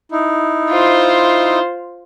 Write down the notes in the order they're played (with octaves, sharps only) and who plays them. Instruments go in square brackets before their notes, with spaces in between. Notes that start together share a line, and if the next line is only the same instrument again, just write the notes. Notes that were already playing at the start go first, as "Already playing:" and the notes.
[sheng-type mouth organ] D#4 E4
[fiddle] F4 C5